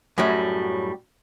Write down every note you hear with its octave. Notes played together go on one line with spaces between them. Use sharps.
F#2 A2 F#3 G3